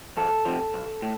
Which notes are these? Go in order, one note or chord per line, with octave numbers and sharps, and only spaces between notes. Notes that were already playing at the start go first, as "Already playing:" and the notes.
E2 A4
C3 F3
B1
A2